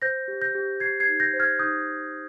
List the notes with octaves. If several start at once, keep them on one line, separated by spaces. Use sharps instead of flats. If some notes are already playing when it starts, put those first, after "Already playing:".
C5 G6 A#6
G4
G6 A#6
G4
G4 G#6 C7
G#6 C7
D#4
G6 A#6
C5
F6 G#6
D#4 D#6 G6